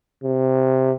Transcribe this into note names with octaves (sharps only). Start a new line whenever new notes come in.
C3